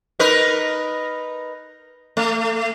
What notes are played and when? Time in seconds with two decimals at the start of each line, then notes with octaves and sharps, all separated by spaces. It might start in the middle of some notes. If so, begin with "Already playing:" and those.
0.20 D#4 A#4 B4
2.17 A3